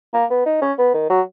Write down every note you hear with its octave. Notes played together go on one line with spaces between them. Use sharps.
A#3
B3
D#4
C#4
B3
D#3
F#3